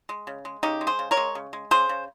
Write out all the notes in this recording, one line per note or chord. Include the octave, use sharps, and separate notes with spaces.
G#3
C#3
G#3
C#3 D#4 G4
G#3
G#4 C5
C#3
A#4 C#5
G#3
C#3
G#3
C#3 G#4 C5
C#3